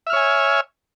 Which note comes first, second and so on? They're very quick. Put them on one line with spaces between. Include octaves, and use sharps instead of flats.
E5 F6 C#5 G#5